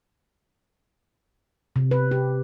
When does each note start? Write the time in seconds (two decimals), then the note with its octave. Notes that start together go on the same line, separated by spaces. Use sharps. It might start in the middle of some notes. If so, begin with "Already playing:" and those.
1.76 C3
1.91 B4
2.11 G4